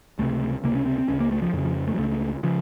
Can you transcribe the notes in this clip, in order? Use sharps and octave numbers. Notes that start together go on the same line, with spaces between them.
C#2 C3 A3
C#2 C3 A#3
C#4
C4
C4
C#2 C#3 C#4
A#3
A3
F3
F2 C#3 D#3
F3
A3
F#3
C#2 C#3 A3
C#3 F3